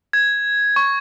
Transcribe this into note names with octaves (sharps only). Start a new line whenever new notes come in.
G#6
C#6